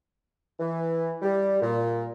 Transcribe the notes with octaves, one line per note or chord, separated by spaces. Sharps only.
E3
G3
A#2